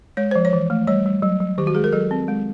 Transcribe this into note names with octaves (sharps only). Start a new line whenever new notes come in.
G#3 C#5
F3 C5
C#5
E3
A3
G3 C#5
G3
F#3
F#3
D#3 G4
F#4
G#3 G#4
A#4
F#3 A4
C4
G#3